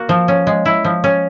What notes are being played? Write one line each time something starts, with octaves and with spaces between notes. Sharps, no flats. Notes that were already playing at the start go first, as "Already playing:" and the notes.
Already playing: A#3 F#4
F3
C#4
G#3
E4
F3
C#4